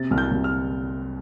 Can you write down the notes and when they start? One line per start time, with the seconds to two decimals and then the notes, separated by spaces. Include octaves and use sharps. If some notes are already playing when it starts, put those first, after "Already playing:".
Already playing: C3 A6
0.11 C2 F6
0.18 G6
0.31 C2
0.44 F6